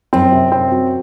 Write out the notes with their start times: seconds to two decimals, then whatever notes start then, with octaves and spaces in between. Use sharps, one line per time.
0.13 F#2 C4
0.32 C3
0.52 C4
0.71 F#3